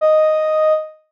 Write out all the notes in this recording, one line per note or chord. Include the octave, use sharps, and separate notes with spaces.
D#5